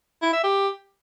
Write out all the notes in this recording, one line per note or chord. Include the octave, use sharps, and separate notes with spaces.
E4
E5
G4